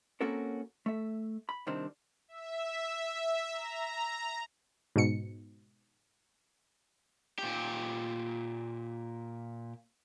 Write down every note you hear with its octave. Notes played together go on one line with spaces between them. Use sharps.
A#3 C4 C#4 F#4 A4 A#4
A3 E5
B5
C2 C3 D#3 C4 D4
E5
A#5
G#2 B2 C#7
A#2 G4